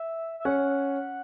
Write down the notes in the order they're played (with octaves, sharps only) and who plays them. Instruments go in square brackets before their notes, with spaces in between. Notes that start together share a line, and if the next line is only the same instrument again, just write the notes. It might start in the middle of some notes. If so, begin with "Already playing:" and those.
Already playing: [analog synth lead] E5
E5
[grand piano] C#4 [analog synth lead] F#5